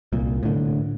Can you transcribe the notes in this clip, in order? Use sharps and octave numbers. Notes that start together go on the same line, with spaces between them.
C2 A#2
A2 D3